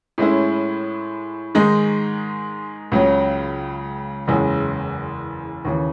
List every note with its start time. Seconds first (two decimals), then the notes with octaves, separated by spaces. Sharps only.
0.18 A2 G#3 C#4 E4
1.55 G#2 D#3 G#3 D#4
2.92 C#2 C#3 F#3
4.28 F#1 E2 C#3 G#3
5.65 D#2 C#3 E3